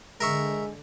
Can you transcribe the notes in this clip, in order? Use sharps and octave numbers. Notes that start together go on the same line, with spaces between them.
D3 G#3 A#4 E5 C#6